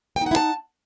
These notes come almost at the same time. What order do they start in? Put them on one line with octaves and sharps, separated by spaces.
G5 D#4 F#5 E4 A5